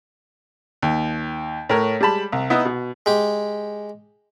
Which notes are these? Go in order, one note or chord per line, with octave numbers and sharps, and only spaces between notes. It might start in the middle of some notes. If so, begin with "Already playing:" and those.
D#2
A2 A#4 C#5
G3 G#3 A5 B5
C2
B3 D#4 E4 E5
B2
G#3 G4